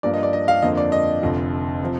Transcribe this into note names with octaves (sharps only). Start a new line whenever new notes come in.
G2 F3 A#3 D5
D#5
D5
D#5
F5
F2 D3 F3 A#3 D#5
D5
D#5
F1 F2 D3
C3 F3